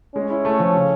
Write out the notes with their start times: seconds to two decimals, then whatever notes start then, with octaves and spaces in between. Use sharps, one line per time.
0.15 G#3 C#4
0.30 E4
0.45 A3
0.60 F3
0.74 C#3